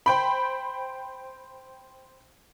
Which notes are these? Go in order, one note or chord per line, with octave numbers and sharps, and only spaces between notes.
C5 G5 B5